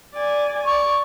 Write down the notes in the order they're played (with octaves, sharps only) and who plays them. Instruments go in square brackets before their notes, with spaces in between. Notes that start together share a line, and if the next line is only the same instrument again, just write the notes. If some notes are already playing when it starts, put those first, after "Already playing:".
[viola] D5 G#5
[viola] D5 [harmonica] C#6